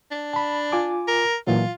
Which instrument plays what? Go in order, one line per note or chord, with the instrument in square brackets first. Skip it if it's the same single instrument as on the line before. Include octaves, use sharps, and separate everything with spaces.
[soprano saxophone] D4
[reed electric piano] A5 B5
F4 G#5 D6
[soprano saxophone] A#4
[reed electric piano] A#2 E3 F#3 [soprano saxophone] F4